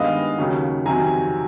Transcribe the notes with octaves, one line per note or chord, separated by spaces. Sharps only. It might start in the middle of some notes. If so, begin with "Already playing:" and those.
Already playing: G2 D#3 G#3 B3 D#5 F5
D#2 C#3 F#3
F2 C3 D#3 F#3 G#5 A#5